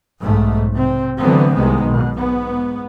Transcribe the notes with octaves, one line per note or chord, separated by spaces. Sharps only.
B1 G#2 A3
C3 C4
D3 E3 F#3 A3 B3 C4
C2 C3 D#3 G#3 B3
B1 B2
G#2 B3